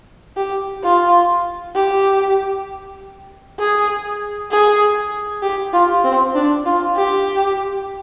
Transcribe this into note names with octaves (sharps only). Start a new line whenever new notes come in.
G4
F4
G4
G#4
G#4
G4
F4
C4
D4
F4
G4